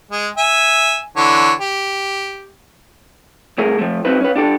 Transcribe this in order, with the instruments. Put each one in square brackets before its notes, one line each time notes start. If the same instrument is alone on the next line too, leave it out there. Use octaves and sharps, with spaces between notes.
[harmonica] G#3
E5 G#5
D3 E3 C#5
G4
[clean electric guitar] C2 A3 G#4 A#4
F3 A3
F#3 C4 D#4 B4
C#4 B4
D4 G4 A4